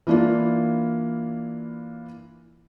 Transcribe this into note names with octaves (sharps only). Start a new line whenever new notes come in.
E3 A#3 D4 E4 F4